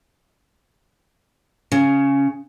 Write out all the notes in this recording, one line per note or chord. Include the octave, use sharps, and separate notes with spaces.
C#3